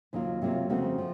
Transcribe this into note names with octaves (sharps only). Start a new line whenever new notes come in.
D#2 C#3 F#3 A#3 F4
C3 F#3 A#3 F4
F2 C#3 A3 C4 F#4
F3